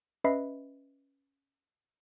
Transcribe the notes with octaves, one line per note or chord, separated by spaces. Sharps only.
C#4 B4 D#5 E5 B5 C7